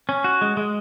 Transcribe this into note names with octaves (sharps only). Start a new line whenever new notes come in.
C#4
F#4
G#3
G#3